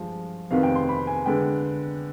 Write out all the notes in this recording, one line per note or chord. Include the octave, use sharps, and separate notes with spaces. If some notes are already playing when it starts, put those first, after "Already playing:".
Already playing: G2 F3 G#3 F5
F2 C3 D#3 B3 F5
G5
C6
B5
G#5
D3 G#3 B3 G5